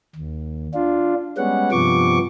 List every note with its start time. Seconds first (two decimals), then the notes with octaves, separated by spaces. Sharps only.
0.16 D#2
0.74 D4 F4
1.37 G3 G#3 B3 C#4 F#5
1.72 G2 C3 F3 B3 C#6 D6